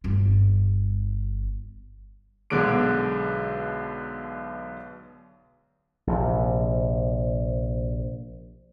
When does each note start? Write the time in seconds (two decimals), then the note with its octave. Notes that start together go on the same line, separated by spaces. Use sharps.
0.04 G1 F4
2.50 B1 B2 D3 G#3 D6 D7
6.07 A#1 C3